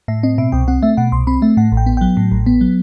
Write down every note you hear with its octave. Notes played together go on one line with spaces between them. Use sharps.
A2 E5
C4 D#5
B2 E5
C2 G5
C4 F#5
A3 E5
B2 F#5
C2 C6
C4 B5
A3 E5
A2 F#5
A1
G5
B3
F#3 G5
A2
A1
B3
F#3